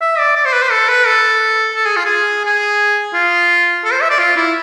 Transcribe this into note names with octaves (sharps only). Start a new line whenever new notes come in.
E5
D5
D5
C5
B4
C5
A4
B4
A4
A4
G#4
F4
G#4
G#4
F4
A4
C5
E5
D5
F4
E4